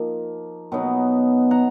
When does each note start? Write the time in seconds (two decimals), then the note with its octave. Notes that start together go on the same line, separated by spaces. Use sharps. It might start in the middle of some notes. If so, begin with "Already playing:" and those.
Already playing: F3 A#3 D#4
0.72 B2 F#3 B3 D#4
1.51 F#5 A#5